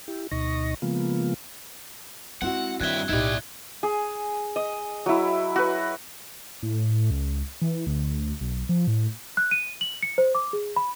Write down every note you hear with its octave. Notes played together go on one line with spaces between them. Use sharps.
E4 G4
D2 B2 D#4 D#5 C#6 A#6
C#3 F3 G#3 A#3 B3 F4
G#3 C4 E4 F#4 F#5
G2 D#3 E5 F#6 G#6 G7
B1 A2 D#4 E4 G4 D5
G#4
D#5
F#3 E4
F#4 B4
A2
C#2
E3
D2
B1
F3
A2
F#6
D#7
F#7
C#7
C5
D6
G#4
B5